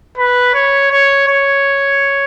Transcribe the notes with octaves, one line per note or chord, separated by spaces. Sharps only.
B4
C#5
C#5
C#5